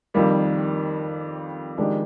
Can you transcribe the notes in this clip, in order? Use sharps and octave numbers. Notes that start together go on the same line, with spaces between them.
F2 D#3 G3 A#3
F2 D#3 G#3 D4 G4